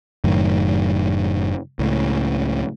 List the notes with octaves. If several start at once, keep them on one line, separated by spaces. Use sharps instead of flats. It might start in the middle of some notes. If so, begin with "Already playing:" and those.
F#1 F#2 A2 D#3
C#2 A2